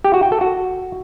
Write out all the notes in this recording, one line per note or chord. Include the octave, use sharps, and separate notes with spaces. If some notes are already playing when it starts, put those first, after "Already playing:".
G4
F#4
G5
A4
F#4